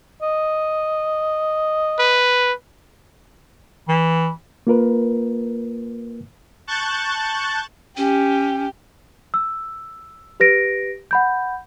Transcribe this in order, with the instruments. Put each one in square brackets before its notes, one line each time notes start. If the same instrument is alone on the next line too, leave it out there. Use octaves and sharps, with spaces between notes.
[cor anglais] D#5
[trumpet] B4
[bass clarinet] E3
[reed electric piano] A#3 F4 A#4 B4
[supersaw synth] A5 C#6 F#6 G6 A6
[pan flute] C#4 [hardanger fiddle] G4
[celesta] E6
G4 B4 A#6 D7
F#5 B5 G6